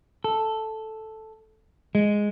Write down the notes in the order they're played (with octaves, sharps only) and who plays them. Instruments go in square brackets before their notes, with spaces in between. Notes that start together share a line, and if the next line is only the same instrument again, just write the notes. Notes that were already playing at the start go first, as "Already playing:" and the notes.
[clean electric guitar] A4
G#3